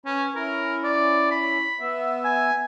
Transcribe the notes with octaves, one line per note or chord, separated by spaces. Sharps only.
C#4 B4
C#4 E4 A#4
D5
B5
B3 E5
G#5